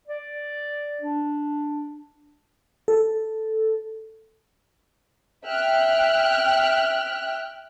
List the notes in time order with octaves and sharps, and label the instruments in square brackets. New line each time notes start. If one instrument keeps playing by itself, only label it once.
[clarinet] D5
D4
[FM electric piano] A4
[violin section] E5 G5 F6 F#6